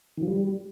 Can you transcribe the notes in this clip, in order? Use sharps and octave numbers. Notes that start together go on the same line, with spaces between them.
D#3
F3
G3